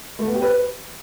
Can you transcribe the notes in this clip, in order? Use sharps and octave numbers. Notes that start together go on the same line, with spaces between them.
A3
B3
G4
B4